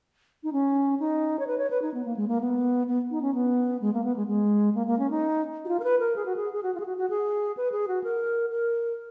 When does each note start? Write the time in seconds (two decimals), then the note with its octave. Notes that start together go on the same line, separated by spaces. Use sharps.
0.43 D#4
0.52 C#4
0.99 D#4
1.39 C#5
1.47 B4
1.58 C#5
1.70 B4
1.82 D#4
1.94 B3
2.05 A#3
2.16 G#3
2.28 A#3
2.41 B3
2.87 B3
3.11 D#4
3.22 C#4
3.34 B3
3.81 G#3
3.93 A#3
4.04 B3
4.16 G#3
4.27 G#3
4.75 A#3
4.87 A#3
4.99 C#4
5.10 D#4
5.65 F#4
5.68 F4
5.79 A#4
5.84 B4
6.00 A#4
6.16 G#4
6.26 F#4
6.36 G#4
6.53 G#4
6.63 F#4
6.75 F4
6.80 G#4
6.85 F#4
6.97 F#4
7.10 G#4
7.57 B4
7.72 G#4
7.88 F#4
8.03 A#4
8.50 A#4